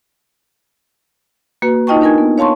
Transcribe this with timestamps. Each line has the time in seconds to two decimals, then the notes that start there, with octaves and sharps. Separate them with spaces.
1.62 A#3 F#4 B4
1.87 D#4 F4 D#5 G5 A5 C#6
2.01 D4 D#4 A#4 G#5 G#6
2.18 B3
2.38 C#5 F5 A5 C6 C#6